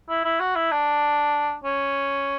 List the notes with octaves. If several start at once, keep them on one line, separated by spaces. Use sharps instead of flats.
E4
E4
F#4
E4
D4
C#4